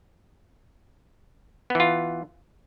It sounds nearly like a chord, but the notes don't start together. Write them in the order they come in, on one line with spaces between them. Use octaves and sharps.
B3 E3 F4